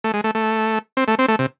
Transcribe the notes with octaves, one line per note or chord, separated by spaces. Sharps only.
A3
G#3
A3
A3
C4
A3
C4
A3
C3